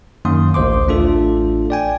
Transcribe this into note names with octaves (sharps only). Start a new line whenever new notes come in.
F#2 D#3 A#3 C6 D#6
A1 D2 C5 C6 D6
A1 A3 D4 F4 A4
D5 G5 G#5